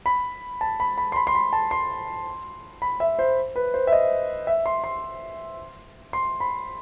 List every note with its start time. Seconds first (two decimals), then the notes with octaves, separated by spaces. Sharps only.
0.06 B5
0.61 A5
0.80 B5
0.98 B5
1.12 C6
1.16 B5
1.27 C6
1.35 B5
1.53 A5
1.71 C6
2.82 B5
3.00 E5
3.19 C5
3.56 B4
3.74 C5
3.87 E5
3.93 D#5
4.47 E5
4.66 C6
4.84 C6
6.13 C6
6.40 B5